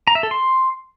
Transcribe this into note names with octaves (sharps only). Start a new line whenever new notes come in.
A#5
E5
A4
C6